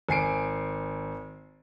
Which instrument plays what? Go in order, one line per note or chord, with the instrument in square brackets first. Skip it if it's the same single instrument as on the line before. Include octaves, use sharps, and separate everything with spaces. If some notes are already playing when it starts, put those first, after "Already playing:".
[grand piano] G#1 G#5 C7 D7